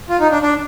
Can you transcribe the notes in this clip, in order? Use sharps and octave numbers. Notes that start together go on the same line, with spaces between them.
F4
D#4
D4
D4